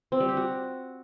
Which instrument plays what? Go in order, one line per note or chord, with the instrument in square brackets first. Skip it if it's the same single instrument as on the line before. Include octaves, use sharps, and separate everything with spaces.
[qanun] C4
G3
G4
F#4